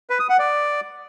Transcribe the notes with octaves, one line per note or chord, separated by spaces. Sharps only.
B4
D#6
F#5
D5